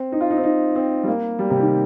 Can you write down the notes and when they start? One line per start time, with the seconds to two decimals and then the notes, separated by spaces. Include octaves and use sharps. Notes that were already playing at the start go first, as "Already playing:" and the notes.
Already playing: C4
0.12 D#4
0.21 F4
0.30 D#4
0.37 C4
0.44 D#4
0.76 C4
1.03 G3
1.07 A#3
1.39 G3
1.50 C3
1.60 D#3